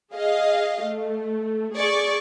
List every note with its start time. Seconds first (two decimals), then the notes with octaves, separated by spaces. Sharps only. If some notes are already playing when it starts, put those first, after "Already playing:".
0.13 G#4 D#5 F5
0.81 A3
1.74 G#4 D5 C#6